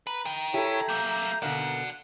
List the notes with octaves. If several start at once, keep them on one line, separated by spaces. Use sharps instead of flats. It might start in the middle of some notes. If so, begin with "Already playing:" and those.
B4 A#5
A#4 G5
E4 G4 A4 C#5
F#3 A#3 E5 G6
B2 D3 A#3 D5 F#5 F#6